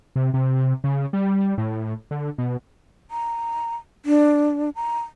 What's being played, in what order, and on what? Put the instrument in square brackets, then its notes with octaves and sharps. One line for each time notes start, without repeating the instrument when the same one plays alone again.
[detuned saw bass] C3
C3
C#3
G3
A2
D3
B2
[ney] A#5
D4
A#5